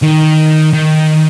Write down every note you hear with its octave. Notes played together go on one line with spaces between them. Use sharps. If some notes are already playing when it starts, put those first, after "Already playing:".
D#3
D#3